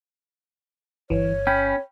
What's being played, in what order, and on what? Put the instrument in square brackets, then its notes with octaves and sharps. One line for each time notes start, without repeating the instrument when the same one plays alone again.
[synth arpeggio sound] G1 [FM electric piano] E3 [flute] C#5
[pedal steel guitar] C#4 [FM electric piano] G5 B5